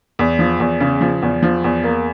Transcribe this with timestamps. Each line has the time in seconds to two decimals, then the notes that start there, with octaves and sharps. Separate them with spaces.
0.19 E2
0.39 F3
0.60 E2
0.80 C#3
1.01 F3
1.22 E2
1.43 F3
1.64 E2
1.83 A#3